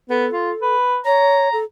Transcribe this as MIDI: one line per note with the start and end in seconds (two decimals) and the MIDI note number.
0.10 0.27 59
0.10 0.75 69
0.32 0.52 65
0.62 0.98 71
1.05 1.49 73
1.05 1.58 82
1.53 1.64 69